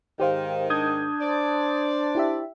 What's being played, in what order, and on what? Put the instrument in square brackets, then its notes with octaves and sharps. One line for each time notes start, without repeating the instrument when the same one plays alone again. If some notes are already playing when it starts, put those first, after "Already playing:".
[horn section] G#2 D#3 [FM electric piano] G4 C5 F5
[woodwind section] D4 [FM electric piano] D#6 G6 G#6
[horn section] C5 D5
[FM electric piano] E4 G4 E5